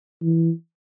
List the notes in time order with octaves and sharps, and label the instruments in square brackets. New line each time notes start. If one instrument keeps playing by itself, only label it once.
[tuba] E3